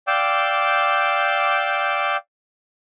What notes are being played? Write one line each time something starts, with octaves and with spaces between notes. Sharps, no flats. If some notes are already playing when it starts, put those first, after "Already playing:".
D5 F5 G5 D6 E6 G6